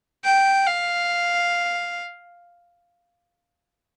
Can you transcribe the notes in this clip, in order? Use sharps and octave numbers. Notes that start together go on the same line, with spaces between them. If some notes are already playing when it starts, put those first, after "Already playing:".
G5
F5